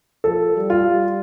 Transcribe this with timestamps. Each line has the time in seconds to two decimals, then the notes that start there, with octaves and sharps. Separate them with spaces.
0.24 F3 A4
0.56 G3
0.70 F4
0.86 G3